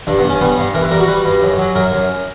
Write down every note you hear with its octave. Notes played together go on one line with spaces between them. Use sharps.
G2 D4
B3
G2
C#4
G3 B3
G2
E3 A#4
B4
G3 A#4
F#4
G3 B4
G2
F#2
F#3
F#2 A#4
F#2